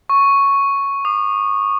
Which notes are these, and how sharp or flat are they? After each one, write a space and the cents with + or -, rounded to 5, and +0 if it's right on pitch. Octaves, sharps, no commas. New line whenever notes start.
C#6 +0
D#6 -45